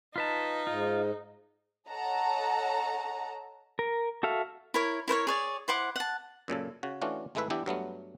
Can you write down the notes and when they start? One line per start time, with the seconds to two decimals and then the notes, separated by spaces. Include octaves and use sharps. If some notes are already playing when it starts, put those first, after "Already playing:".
0.16 D#4 F4 B4 A5
0.67 G#2 F4
1.90 A4 C#5 D#5 F#5 A5 A#5
3.79 A#4
4.23 F#4 A4 E5 F5
4.74 E4 A#4 C#5
5.08 E4 A#4 C5 C#5
5.27 G#4 C#5 D5
5.68 E4 C5 F#5 D6
5.96 F#5 A5
6.48 F#2 A#2 C#3 A4
6.83 C#3 F#4
7.02 E3 A3 C#4 D4 F4 F#4
7.35 G#1 G#3 A3 E4 B4 E5
7.50 E3 B3 D4 E4 G4
7.66 G2 F#3 A3 B3